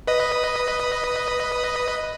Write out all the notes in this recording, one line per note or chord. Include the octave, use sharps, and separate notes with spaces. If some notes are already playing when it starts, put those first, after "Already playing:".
B4 D#5